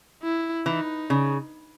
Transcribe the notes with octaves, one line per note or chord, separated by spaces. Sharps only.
E4
E3 D#4
C#3